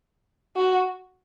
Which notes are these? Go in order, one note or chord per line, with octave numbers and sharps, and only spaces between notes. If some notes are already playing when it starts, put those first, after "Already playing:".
F#4